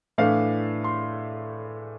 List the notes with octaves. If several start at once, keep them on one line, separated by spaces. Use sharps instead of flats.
A2 E3 A3 D4 F5
C6